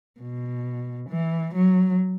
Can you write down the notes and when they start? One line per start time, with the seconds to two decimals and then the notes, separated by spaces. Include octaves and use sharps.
0.21 B2
1.09 E3
1.54 F#3